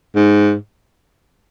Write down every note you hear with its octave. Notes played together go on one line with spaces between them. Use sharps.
G#2